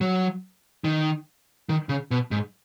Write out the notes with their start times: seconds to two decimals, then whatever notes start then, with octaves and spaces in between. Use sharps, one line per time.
0.01 F#3
0.84 D#3
1.69 D#3
1.89 C#3
2.11 B2
2.31 G#2